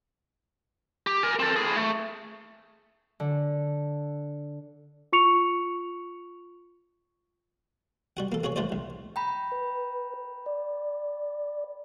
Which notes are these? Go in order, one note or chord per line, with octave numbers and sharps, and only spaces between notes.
G4
A#4 G#5
C4 A4
A2 G#4
A3
D3
F4 C#6 C#7 F7
G3 F#4 F#5
A#3 A4
A#3 F#4 G#4 C#5
C2 A3 F#4 C5 D5
C2
G5 A#5 B5
B4
D5